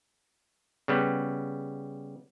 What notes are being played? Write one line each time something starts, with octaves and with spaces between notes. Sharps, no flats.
C#3 G3 B3